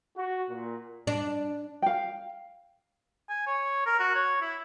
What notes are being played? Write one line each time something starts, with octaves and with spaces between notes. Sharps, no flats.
F#4
A#2
D4
F5 G5
G#5
C#5
A#4
F#4
C#5
E4